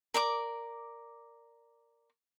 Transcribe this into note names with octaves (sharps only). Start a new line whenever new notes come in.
A#4 D5 D6